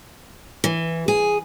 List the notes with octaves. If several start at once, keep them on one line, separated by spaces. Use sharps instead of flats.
E3
G#4